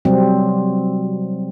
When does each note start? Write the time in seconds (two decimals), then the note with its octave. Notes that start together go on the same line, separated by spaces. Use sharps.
0.05 C3 F#3 G3 C4